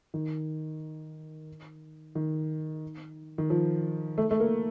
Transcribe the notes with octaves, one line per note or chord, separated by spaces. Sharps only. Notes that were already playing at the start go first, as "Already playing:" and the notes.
D#3
D#3
D#3
F3
A3
A3
A#3